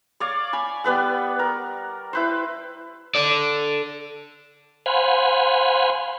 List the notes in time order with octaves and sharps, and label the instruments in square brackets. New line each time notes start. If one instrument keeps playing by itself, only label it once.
[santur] C#5 D5 F5
G#5 B5
G3 B3 B4 F#5
A#4
E4 B4 C5
[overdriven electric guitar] A4 D5
[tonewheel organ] C5 F5 F#5 G#5 B5 C6